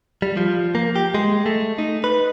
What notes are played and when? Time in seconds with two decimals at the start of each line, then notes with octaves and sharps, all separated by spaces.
0.22 G3
0.37 F3
0.75 A#3
0.96 G4
1.15 G#3
1.46 A3
1.78 D#4
2.04 B4